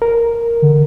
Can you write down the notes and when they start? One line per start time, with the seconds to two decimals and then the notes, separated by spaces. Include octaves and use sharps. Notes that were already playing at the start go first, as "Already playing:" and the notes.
0.02 A#4
0.62 D3